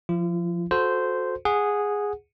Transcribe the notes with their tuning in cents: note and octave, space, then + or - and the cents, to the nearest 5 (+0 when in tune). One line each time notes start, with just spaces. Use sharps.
F3 +0 F4 -40
F#4 -25 A4 +0 C5 -10
G#4 -5 F#5 -15